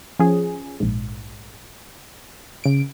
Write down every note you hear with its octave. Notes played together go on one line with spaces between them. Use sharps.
F3 C#4 G#4
A#1 G#2
C#3 D7